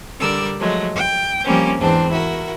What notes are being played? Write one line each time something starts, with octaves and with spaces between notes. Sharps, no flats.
D3 G3 A#4 D5 E6
F3 F#3 G#3 A3
G5
F3 G3 A#3 C4 C#4
E2 G#2 E3 C4 D4 C5
E4 F#4 A#4